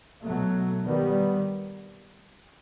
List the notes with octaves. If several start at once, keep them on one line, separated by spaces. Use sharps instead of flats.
B2 F#3 A3
D#3 G3 B3